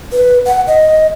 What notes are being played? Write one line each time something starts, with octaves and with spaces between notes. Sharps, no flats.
B4
F#5
D#5